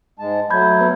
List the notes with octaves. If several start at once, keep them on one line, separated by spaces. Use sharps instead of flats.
G#2 G#3 A5
F#3 A3 B5 G6 G#6
B3 B4